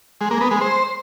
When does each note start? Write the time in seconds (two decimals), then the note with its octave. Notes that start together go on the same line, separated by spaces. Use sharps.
0.21 G#3
0.31 A#3
0.41 B3
0.51 G#3
0.61 C5